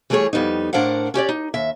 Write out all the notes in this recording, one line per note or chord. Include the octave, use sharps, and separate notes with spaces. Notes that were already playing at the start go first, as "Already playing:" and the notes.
E3 G3 A3 F4 G#4 C#5
F2 G3 B3 D#4
A2 D4 A#4 C5 F5 F#5
C#4 G4 C#5 D5
D#4
D#2 E5